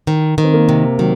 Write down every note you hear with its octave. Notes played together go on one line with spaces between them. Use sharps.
D#3
D#3
C4
A#3
C3
D#3 F#3